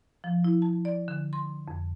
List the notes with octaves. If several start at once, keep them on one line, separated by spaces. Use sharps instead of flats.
F3
E4
A5
D5
D3
C6
F2